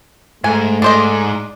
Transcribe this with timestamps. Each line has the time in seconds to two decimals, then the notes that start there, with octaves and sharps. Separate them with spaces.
0.44 G#2 A3 G#5
0.82 G#2 D4 C5 D#5